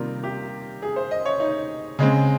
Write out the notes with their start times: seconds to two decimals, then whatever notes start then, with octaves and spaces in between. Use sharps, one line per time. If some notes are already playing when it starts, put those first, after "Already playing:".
Already playing: C3 D#3 G3 A#3 F4
0.24 G4
0.82 G#4
0.96 C5
1.11 D#5
1.26 C#5
1.40 D#4
1.99 C#3 G#3 C4